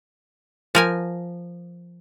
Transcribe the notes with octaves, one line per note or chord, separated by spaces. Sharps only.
F3 A#4 G#5